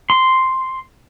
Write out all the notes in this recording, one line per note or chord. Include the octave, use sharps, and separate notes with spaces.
C6